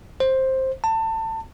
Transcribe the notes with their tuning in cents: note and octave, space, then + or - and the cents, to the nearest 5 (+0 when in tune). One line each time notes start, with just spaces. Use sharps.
C5 +10
A5 +25